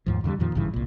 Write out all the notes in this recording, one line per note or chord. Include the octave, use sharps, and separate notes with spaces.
D#2 G#2 F3
F2 D3 E3 G3
F2 A#2 D#3 F3
G#1 G2 C#3 E3
C2 A#2